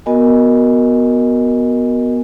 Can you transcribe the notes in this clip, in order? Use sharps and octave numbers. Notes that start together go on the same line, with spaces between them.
B3 F#4 A#4 D#5 G#5